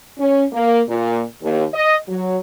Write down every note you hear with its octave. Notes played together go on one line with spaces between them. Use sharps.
C#4
A#3
A#2
D#2
D#5
F#3